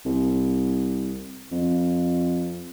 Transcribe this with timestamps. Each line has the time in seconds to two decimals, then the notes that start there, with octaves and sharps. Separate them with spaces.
0.06 C2
1.52 F2